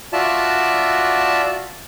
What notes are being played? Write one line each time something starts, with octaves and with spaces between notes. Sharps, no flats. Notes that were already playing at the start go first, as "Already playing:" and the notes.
F4 F#4 D5 E5 A5